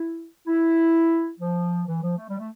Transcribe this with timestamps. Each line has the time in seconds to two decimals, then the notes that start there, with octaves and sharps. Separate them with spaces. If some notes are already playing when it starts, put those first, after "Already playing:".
Already playing: E4
0.47 E4
1.39 F3
1.87 E3
2.02 F3
2.17 A3
2.29 G3
2.39 A3